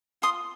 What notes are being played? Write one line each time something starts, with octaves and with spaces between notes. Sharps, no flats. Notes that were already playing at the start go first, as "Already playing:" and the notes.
F4 C6 D#6